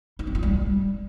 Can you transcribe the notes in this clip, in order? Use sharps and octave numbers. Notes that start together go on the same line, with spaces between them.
D#4
C4
F4
G3